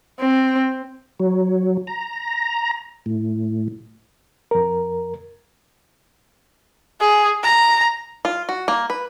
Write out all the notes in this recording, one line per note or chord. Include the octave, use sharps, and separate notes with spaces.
C4
F#3
A#5
A2
F2 A#4
G#4
A#5
F4
F#4
A#3
B4